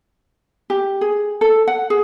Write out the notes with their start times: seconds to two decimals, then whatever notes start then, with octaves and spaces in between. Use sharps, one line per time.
0.70 G4
1.01 G#4
1.41 A4
1.67 F#5
1.90 G#4